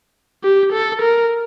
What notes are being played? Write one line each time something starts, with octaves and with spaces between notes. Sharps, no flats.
G4
A4
A#4